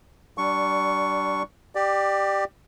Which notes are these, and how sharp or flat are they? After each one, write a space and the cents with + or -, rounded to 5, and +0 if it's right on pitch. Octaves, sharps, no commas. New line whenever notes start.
G3 -25 D4 +0 C#6 +5
G4 +0 D5 +20